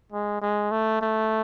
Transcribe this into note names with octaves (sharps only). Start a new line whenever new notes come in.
G#3
G#3
A3
A3